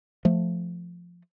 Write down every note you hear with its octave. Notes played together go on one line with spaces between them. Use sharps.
F3 A3